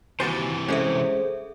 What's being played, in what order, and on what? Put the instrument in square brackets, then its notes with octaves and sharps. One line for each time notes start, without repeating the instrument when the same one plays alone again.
[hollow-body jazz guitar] D#2 F#4 C5 [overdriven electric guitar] C3 E3 [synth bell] G#5 A6
[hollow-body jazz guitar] G#3 C#4 [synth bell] G#4 A4 E5 [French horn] C5